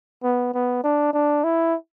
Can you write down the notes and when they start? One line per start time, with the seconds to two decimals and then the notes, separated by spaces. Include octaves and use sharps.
0.24 B3
0.54 B3
0.84 D4
1.13 D4
1.44 E4